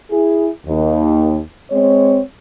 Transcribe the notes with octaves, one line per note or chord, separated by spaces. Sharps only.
E4 G#4
D#2
G#3 C4 C#5